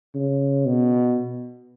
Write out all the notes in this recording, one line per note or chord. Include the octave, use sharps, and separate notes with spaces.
C#3
B2